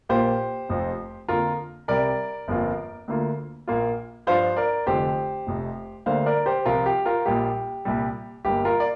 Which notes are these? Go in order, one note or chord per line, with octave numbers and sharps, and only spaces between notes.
A#1 A#2 A#3 F4 G4 C5
F1 F2 F3 C4 F4
F2 D3 A#3 F4 A#4
C2 C3 G3 A#4 D5
G1 F2 F3 A#3 F4
D2 D3 A#3 F4
A#1 A#2 A#3 F4
G2 F3 D4 F4 C5 F5
A#4 D5
F1 F2 D3 F3 G4 C5
F1 F2 C3
D2 D3 G3 A#3 D4 C5 F5
A#4 D5
G4 C5
C2 C3 F3 F4 A#4
G4
F4 A#4
A#1 A#2 G3 A#3 F4 G4
C2 A#2 G3
G1 G2 G3 A#3 G4
F4 A#4
D5